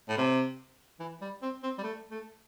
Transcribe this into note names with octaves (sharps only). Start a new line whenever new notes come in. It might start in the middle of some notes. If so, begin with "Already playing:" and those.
A2
C3
E3
G3
C4
C4
G3
A3
A3